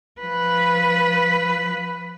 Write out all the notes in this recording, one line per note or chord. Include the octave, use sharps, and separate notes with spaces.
F3 B4